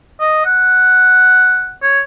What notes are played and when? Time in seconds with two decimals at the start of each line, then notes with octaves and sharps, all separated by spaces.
0.20 D#5
0.45 F#5
1.82 C#5